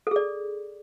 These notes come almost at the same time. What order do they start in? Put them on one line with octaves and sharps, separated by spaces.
A4 G#4 D5